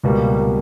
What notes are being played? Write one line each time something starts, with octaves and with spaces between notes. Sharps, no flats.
C#2 B2 G3 A#3
B2 G3 A#3